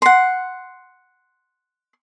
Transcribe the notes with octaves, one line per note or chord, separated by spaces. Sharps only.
F#5 C6